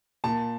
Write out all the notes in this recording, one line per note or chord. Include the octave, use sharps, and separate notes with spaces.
A#2 A5